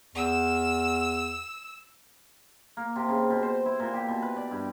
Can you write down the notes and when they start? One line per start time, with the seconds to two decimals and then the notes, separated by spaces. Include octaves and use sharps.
0.15 E2 E6
2.77 A#3
2.96 C3
3.09 C#3
3.30 B2
3.43 C5
3.66 E4
3.80 A#2
3.93 G4
4.08 B2
4.22 B4
4.37 D5
4.51 G2